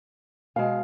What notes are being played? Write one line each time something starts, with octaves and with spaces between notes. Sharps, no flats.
B2 G#3 F5